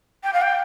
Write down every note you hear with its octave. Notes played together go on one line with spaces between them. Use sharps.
G5
F5
G5